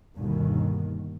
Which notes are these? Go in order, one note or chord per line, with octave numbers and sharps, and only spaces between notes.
G1 D#2 B2 D#3